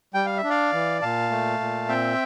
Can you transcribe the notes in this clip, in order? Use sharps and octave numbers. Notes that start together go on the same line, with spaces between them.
G3 G5
F5
E5
D4
D5 F5
E3
A#2 F5 A5
A3
A#2
C4 E5 G5